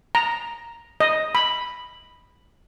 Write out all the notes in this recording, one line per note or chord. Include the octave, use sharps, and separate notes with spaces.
A#5
D#5
B5